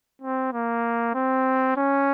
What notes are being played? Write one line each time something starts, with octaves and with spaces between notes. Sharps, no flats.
C4
A#3
C4
C#4